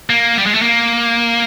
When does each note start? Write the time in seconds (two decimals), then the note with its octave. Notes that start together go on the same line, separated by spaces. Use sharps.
0.10 A#3
0.38 G3
0.46 G#3
0.54 A3
0.62 A#3